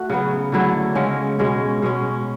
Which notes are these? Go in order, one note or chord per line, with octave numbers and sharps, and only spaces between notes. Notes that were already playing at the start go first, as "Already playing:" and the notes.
Already playing: A3 F#4
C#3 F#3 B3
D3 F#3 A3 E4
C#3 G#3 C#4
B2 G#3 C#4
B2 G#3 C#4